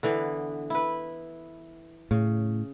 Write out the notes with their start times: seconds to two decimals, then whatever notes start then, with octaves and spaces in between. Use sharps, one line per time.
0.03 D3 E3 B3
0.70 E4 B4
2.11 A2 C#3